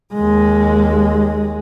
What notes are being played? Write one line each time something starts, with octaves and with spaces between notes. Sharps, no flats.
D#2 G#3